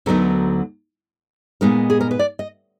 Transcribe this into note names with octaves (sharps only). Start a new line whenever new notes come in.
D2 D3 F#3 B3 D#4 A#4
A#2 G#3 B3 D#4 A#4
G#4
A#4
B4
D5
D#5